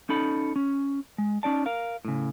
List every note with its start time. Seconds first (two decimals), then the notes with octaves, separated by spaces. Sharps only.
0.09 C#4 D#4 A4 B5
0.56 C#4
1.18 G#3
1.43 C#4 D#4 D5 A5
1.66 A#4 F5
2.05 A2 C#3